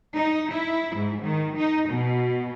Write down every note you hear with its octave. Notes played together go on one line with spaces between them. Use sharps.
D#4
E4
G#2
D#3
D#4
B2